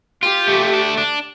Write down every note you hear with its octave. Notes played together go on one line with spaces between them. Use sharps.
F4 G4
A3
D4
D4